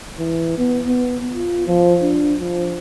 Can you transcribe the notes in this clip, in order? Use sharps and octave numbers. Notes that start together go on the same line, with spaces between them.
E3
B3
B3
F4
F3
D4
F3